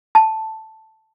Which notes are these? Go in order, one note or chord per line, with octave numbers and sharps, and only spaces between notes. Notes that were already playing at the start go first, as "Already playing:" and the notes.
A5